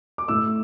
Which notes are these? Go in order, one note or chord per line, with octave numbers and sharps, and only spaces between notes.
D6
A2 E6